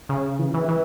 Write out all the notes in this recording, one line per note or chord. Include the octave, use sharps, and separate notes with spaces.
C#3
E3
E3
E3